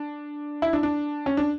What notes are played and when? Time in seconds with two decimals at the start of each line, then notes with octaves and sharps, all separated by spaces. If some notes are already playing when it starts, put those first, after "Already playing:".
Already playing: D4
0.62 E4
0.73 D4
0.83 D4
1.26 C#4
1.37 D4